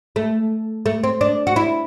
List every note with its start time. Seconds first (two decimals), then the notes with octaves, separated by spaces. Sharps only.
0.16 A3
0.86 A3
1.04 C4
1.21 D4
1.47 F#4
1.56 E4